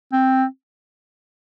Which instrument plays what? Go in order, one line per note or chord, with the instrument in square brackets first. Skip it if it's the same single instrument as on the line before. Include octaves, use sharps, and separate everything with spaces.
[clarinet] C4